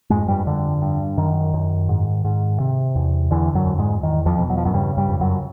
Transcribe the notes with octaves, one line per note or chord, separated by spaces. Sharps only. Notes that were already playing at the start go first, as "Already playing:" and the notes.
F2 G#2 G#3
G2 G3
G2 D3
G2
F#2 D#3
F#2
G#2
G#2
C3
E2
E2 D3 E3
F#2 F#3
F2
G#2 G#3
E2 D#3
F2 F3
B2
F#3
F3
F#2 F#3
G2 C#3 G3
G2 G3
F2
F#2 F#3